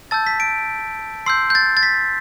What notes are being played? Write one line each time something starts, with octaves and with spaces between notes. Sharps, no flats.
A5 E6 G6 A6
B6
D7
C6 E6 G6 C7
G6
A6
A6
B6